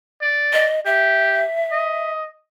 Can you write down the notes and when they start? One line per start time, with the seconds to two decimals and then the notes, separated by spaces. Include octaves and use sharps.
0.22 D5
0.53 D#5
0.86 G4 E5
1.72 D#5